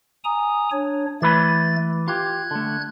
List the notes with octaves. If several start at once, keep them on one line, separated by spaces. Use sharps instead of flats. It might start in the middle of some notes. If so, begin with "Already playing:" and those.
G#5 A#5 D#6
D4 C#5
E3 A3 B4 B5 A6
F4 G4 F#6 G#6
D3 A3